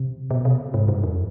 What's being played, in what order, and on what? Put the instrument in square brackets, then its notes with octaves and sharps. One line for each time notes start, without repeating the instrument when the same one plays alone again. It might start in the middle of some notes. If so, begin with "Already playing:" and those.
Already playing: [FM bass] C3
B2
C3
G#2
G2
F2